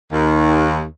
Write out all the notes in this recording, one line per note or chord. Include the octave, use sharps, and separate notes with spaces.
D#2